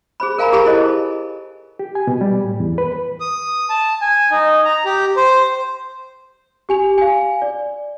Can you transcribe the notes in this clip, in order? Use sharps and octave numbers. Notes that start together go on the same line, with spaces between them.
G#4 C5 B5
A#4 F5 G#5 A#5 B5
G4 G#4 A#4 G#5 A5 B5
E4 A4 C5 D#5
G4
G#5
B2
G3
A2
E2
B4
D#6
A5
G#5
D#4
A#5
G4
C5
G4 G#5 F7
F5 G#5
D5